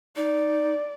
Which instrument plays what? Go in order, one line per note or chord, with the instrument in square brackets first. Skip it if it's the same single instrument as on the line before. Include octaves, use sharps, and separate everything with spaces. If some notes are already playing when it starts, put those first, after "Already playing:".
[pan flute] D#4 [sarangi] D5